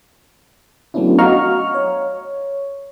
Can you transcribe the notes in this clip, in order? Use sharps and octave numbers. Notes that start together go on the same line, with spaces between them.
F#3 A3 B3 C#4 D4 E4
F#4 D#5 F5 A#5 C#6 F6
C#5